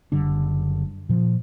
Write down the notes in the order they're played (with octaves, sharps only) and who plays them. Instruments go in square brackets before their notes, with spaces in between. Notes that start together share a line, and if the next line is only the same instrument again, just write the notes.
[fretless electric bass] F#1 D3 G3 D4
A#2 F3